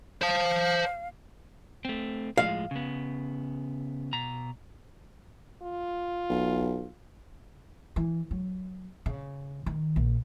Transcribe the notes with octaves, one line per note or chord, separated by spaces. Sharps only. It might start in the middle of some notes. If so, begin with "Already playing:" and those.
C5 F5 A5
A3 C4
A2 F3 G#3 F5
C#3 B3
B2 A#5
F4
B1
E3
F#3
C#3
D#3
A#1